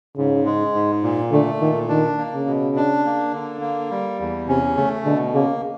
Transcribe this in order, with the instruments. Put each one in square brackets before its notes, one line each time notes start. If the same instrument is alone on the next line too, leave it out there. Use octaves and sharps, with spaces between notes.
[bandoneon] G#2 [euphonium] C#3
[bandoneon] G#3
G#2
A#2
[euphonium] D3 [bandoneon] A3
[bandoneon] A#2 [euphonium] D#3
[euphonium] D#3 [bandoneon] D4
[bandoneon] A#3
[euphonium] C#3
[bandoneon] B2
D4
A#3
D3
A#3
G3
E2
[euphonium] C3 [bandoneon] C#4
[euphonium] C#3 [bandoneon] A3
[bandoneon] B2 [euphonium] D3
[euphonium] C#3 [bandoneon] A#3